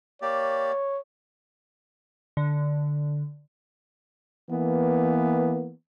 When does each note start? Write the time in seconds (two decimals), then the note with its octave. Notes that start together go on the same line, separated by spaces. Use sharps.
0.22 A#3 G4 C#5 D5
2.37 D3
4.51 E3 A#3 B3